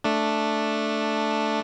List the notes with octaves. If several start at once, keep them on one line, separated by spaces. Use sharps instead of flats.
A3 D4